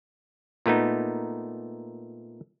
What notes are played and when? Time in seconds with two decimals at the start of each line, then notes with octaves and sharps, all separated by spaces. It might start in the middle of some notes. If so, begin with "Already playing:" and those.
0.66 A#2 A3 B3 D#4